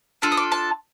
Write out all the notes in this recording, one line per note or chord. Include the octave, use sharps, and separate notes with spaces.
D4 F4 A4
D#6
D6
A5